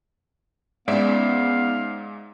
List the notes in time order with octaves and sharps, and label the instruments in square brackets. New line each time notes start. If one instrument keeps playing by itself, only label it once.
[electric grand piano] G#2 G#3 E5 [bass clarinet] B3 [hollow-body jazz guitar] C#4 D#4 D5 [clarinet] F5